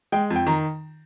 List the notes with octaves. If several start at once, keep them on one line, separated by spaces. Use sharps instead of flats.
G#3 G5
F2
G5
D#3 A#5